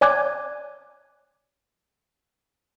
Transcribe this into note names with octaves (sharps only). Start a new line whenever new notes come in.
C#5 D5 G#5 D6 F#6 G#6